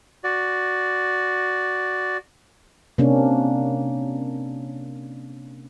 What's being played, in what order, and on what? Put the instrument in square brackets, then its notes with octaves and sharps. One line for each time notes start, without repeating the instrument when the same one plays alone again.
[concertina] F#4 D5
[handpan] C3 A#3 C#4 D4